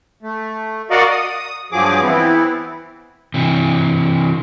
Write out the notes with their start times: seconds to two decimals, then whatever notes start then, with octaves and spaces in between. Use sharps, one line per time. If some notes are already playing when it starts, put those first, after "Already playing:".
0.23 A3
0.90 F#4 A#4 D5 D#5 F5 F#5
1.11 D#6
1.72 G2 F3 F#3 G#4 D6
2.03 E3 B3 C4 E4
3.34 C3 E3